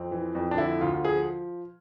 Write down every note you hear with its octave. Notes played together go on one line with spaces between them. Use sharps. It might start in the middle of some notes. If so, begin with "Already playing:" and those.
Already playing: F2 C4
E3
F2
D4
D3 E4
D2 F4
F4
F3 G#4